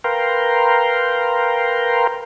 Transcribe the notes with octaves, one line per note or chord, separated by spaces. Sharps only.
A#4 B4 F5 G5 A#5 C6